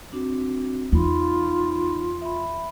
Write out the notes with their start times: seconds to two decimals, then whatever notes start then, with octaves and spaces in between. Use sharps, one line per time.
0.12 C4 D4 F#4
0.92 E2 D#4 F4 B5
2.21 E5 B5